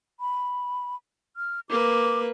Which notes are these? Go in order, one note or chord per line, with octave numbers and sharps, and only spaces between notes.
B5
F6
A#3 B4 D6